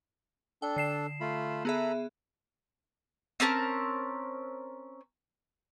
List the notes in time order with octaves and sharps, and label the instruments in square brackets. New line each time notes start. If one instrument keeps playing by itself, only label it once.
[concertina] D4 A4 [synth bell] G5
[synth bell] D3 C7 E7
[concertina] A3 F4 B5
[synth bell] B3 G#4 E5 [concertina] A4 A#5 B5
[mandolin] C4 C#4 A#4 A5